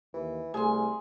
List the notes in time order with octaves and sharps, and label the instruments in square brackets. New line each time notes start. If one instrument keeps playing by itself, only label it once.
[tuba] D#2 [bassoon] E3
[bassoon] C2 [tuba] A3 [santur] G#4 [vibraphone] G#5 C6